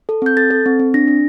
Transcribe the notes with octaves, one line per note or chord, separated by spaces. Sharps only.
A4
C4 G6
A4 A6
A4
C4
C4
D4 A#6
D4